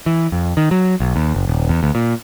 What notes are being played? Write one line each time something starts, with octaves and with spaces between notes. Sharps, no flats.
E3
F2
D#3
F#3
B1
D#2
F#1
D#1
E2
D2
A#2